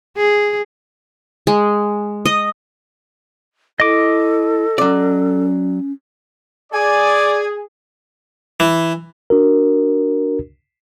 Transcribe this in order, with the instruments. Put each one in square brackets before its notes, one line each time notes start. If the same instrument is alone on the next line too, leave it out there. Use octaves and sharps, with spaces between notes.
[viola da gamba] G#4
[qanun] G#3
D#5
[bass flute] E4 [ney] A4 [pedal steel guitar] D#5 D6
[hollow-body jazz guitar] F#3 D5 [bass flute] C#4
[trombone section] G#4 [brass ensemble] D5 [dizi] G#5
[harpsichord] E3
[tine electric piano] D4 F#4 A#4